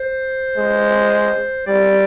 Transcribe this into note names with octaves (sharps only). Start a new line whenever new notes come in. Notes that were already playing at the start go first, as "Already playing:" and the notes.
Already playing: C5
G#3
G3 D5